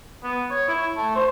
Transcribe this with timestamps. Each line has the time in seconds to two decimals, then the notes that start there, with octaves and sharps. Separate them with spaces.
0.24 B3
0.50 C#5
0.68 E4
0.96 A3
1.16 C5